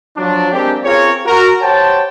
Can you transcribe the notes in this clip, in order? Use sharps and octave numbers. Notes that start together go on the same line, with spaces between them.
F3 F#3 D4
G#3 A#3 C4 D4 G4
C4 C#4 F4 G#4 A#4 C#5
F#4 A#4
G4 C5 C#5 F#5 G5 A5